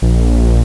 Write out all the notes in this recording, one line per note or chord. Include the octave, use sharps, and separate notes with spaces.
A#1